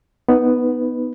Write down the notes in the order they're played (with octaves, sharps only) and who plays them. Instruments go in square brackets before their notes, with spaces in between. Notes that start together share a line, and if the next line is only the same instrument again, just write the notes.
[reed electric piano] B3 D#4 B4